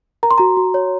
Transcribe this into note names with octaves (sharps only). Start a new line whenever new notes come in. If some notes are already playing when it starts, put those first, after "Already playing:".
A#4 A#5
C6
F#4 A#5
F#4
C#5